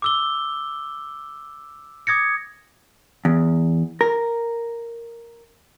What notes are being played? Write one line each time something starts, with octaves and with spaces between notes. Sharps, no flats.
D6 E6 G7
D6 D#6 G#6 A#6 C#7
E2
A#4